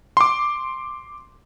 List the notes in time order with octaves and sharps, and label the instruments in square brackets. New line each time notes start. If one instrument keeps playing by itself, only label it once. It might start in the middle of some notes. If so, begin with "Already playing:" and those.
[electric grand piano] C6 D6